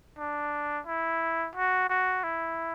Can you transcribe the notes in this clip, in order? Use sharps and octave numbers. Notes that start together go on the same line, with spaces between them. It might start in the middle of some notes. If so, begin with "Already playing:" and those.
D4
E4
F#4
F#4
E4